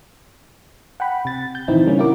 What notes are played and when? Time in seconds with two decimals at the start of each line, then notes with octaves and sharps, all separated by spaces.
1.00 F#5 G5 B5
1.25 C3 A6
1.55 G6
1.68 A#2 D#3 E3 C4 D#4 E4
1.85 C#3 G3 A#3 C#4
1.99 E4 F#4 A#4 D6